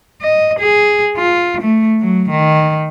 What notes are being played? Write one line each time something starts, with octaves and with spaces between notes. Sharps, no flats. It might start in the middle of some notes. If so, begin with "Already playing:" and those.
D#5
G#4
F4
A3
F#3
D#3